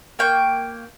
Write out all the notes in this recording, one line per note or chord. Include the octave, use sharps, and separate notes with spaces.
A#3 G5 C#6